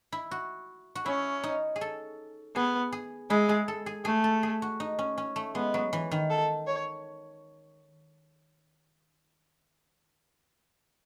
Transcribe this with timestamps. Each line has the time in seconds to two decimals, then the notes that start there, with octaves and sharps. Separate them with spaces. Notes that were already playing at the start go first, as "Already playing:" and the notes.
0.12 E4
0.31 F#4
0.95 F#4
1.06 C#4 E4
1.44 D#4
1.76 G#4
1.81 A4
2.56 B3 G#4
2.92 G#4
3.30 G#3 E4
3.49 G#4
3.68 A4
3.86 G#4
4.05 A3 G#4
4.24 A4
4.43 G#4
4.62 F#4
4.80 D#4
4.99 C#4
5.18 C#4
5.36 A3
5.55 G#3 B3
5.74 F#3
5.93 E3
6.11 D#3
6.30 A4
6.68 C#5